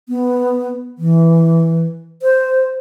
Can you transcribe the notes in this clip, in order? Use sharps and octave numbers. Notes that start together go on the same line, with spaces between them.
B3
E3
C5